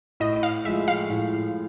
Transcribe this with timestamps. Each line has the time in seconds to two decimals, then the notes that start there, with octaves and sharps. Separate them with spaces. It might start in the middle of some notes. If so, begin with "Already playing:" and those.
0.20 A2 D#5
0.43 F5
0.65 F3 G#3 E5
0.88 F5
1.10 A2